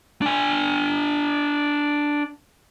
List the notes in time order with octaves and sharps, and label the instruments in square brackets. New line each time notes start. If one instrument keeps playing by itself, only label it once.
[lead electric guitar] D4 G#5